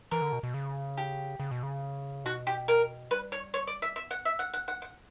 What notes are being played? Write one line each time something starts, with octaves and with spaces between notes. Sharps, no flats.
E3 A#4
D3
B2
B2
C#3
G4
C#3
B2
C#3
B2 F#4
G4
A#4
G3 B4
C#5
C#5
D5
E5
B3 E5
F#5
E5
F#5
F#5
F#5
C#4 F#5